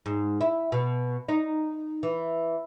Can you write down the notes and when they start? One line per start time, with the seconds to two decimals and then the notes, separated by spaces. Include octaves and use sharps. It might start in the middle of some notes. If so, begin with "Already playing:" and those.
0.06 G#2
0.41 E4
0.72 B2
1.29 D#4
2.03 E3